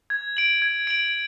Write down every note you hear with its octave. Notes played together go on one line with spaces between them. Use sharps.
G#6
D7 F#7
G#6
D7 F#7